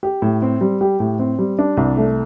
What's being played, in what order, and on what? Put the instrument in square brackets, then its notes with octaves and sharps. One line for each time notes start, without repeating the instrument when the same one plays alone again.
[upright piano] G4
A2
C4
G3
G4
A2
C4
G3
D4
C2
A3